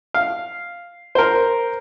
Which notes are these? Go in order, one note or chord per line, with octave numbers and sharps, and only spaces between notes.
F5
A#4 C5